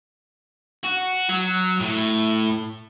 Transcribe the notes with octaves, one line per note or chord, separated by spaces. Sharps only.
F#4
F#3
A2